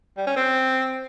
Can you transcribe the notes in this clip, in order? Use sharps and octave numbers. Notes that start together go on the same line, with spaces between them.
G3
C#4
C4